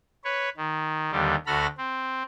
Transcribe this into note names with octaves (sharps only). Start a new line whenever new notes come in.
B4 C#5
D#3
D#2 D3 G3
D2 F#4 A4 B5 F6 A#6
C4